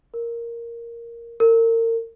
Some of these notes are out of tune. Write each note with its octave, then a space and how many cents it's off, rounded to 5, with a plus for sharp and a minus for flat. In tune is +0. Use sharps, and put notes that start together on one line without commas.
A#4 +0
A#4 -35